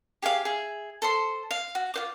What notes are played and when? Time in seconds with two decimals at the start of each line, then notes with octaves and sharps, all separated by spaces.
0.22 G4 G#4 E5 F5
0.45 G#4 E5
1.02 A4 C5 C6
1.51 F5
1.75 F#4
1.94 F4 C5 D6